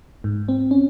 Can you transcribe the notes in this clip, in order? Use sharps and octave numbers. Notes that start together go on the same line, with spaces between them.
G#2
C4
C#4